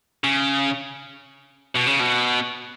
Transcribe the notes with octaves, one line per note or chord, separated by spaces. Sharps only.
C#3
B2
C#3
B2